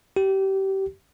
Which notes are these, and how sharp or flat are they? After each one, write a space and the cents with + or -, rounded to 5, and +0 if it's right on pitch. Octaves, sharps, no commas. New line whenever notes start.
G4 -25